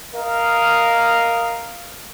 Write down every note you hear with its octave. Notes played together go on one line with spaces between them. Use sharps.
A#4 D#5 F5